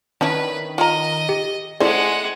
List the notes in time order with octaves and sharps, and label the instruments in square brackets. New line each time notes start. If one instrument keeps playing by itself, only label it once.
[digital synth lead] D#3 [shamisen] C#4 D4 E4 [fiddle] B4
[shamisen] F4 A#5 [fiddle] D#5
[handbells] G4
[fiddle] G#3 F#5 [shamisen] A3 C#4 C5 [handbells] E4 D5 [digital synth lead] G#4